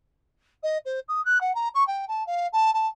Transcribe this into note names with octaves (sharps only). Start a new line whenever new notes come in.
D#5
C5
D#6
F#6
F#5
A#5
C#6
G5
A5
F5
A5
A5